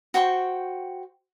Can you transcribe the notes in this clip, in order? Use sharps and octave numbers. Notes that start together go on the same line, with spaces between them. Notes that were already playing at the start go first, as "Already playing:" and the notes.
F#4 C5 G5 C#6